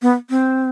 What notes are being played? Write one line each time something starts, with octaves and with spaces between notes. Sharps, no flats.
B3
C4